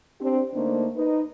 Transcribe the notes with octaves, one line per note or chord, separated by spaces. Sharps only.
C4 D4 G4
D3 A3 A#3 D4 D#4 C5
D#4 B4